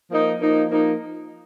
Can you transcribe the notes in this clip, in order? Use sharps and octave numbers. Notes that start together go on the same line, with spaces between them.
F3 A#3 D#4
F3 A#3 D#4
F3 A#3 D#4